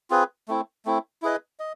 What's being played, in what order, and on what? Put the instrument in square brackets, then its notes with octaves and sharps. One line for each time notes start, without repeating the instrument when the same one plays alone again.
[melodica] C4 F4 G#4 B4
A3 C4 E4
A3 C4 E4
E4 G#4 B4 D#5
D#5